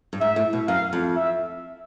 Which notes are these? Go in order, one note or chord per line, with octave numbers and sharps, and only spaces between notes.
G2
G#2 E5
A2
B2
F#2 F5
F2
E5